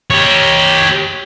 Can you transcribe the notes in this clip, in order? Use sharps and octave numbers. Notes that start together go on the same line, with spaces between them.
G4 C#5